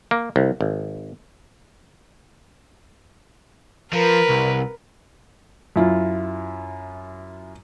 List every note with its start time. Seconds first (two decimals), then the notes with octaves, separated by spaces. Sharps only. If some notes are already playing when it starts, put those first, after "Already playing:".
0.11 A#3
0.36 C2
0.61 G#1
3.93 F3 A#4 B4
4.29 C2
5.76 F#2 E4 F4